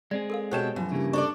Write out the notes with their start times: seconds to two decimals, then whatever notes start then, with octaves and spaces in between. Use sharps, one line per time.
0.11 G#3 C4 G#4 D5
0.30 A4 A#4 F5
0.51 B2 G4 A4 C5 C#5 G5 A5 E7
0.76 F#2 E3 F3
0.92 G2 C#3 G3 A#3
1.13 D4 A4 D5 C#6